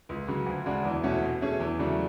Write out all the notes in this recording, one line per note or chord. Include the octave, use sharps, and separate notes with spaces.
C#2
C#3 F#3
D2
C#3 G#3 D4 F#4
E2
B2 A3 C#4 F#4
B2
A3 C#4 G#4
E2
C#3 F#3 A3 D4